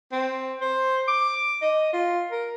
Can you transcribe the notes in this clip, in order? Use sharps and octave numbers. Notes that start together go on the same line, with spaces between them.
C4
C5
D6
D#5
F4
A#4